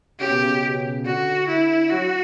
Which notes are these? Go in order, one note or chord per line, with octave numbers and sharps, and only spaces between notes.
C#3 G4
B2
C#3
D3 F#4
E4
F#3 F#4